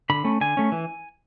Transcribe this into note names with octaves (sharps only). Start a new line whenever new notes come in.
D3 B5
A3 C#4
D3 G#5
A3 C#4
E3